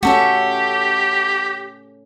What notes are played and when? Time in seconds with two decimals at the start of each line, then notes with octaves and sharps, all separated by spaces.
0.03 A3 C#4 F#4 G4 A4 E5